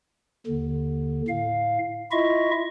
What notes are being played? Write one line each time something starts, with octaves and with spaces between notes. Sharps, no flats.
D#2 D3
A2 F5
E4 F4 D#5 E5 C#6